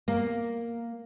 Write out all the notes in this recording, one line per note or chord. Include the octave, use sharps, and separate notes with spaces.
A#3